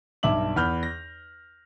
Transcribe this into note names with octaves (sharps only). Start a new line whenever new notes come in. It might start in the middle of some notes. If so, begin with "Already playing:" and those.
B1 G2 E5 D6 F#7
E2 B5 F6 G6
A#6